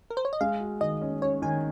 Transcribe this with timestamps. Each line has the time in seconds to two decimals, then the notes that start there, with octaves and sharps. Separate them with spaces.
0.10 A#4
0.17 C5
0.25 C#5
0.33 D#5
0.41 G#3 F5
0.60 F#4
0.81 D#3 D#5
1.02 C#4
1.22 C#4 C#5
1.42 D#3 G#5